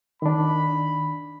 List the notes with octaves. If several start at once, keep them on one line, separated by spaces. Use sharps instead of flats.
D#3 D4 B5